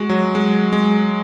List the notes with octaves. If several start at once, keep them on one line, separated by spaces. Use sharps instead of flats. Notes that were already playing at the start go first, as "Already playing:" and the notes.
Already playing: G#3 F#4
F#3
G#3
G#3